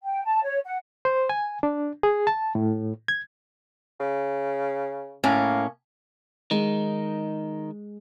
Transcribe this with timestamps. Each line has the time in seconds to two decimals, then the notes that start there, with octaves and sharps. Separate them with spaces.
0.02 G5
0.25 A5
0.44 C#5
0.65 F#5
1.05 C5
1.29 G#5
1.63 D4
2.03 G#4
2.27 A5
2.55 A2
3.08 G#6
4.00 C#3
5.24 A2 A#3 C#4
6.51 D#3 G#3 D#4